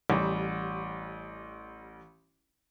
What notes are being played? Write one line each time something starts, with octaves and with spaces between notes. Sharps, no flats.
A1 G3